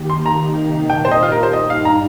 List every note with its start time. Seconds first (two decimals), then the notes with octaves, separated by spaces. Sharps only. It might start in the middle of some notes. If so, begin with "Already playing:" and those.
Already playing: D#3 A#3 G4
0.10 C6
0.26 C3 D#3 A#3 D#4 G4 A#5
0.90 A#2 A#3 G4 G5
1.05 C5
1.11 D#5
1.22 F4
1.32 A#4
1.43 C5
1.53 G2 G3 D#4 G4 D#5
1.70 F5
1.85 A#5